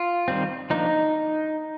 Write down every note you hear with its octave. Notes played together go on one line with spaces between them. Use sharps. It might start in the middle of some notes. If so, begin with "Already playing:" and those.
Already playing: F4
D#3 G3 C4
F3 A#3 D4 D#4